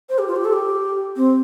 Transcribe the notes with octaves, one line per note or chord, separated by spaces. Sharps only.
C5
G4
F4
G4
A4
G4
C4